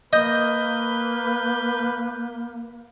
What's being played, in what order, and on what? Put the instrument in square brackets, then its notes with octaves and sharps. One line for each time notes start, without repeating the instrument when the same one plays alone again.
[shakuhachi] A#3 [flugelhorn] B4 [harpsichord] D#5 [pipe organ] G6